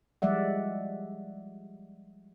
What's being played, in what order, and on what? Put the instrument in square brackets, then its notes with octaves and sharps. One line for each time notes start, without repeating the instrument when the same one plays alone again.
[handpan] F3 G3 G#3 D5 E5 F#5